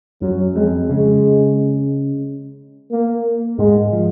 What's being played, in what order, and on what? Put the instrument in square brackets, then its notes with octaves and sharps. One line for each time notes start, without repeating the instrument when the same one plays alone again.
[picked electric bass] F#2 [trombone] F#3
[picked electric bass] F2 [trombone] G#3
[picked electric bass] C#3 [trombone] G#3
[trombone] A#3
[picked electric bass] G#2 [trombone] G#3
[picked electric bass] F3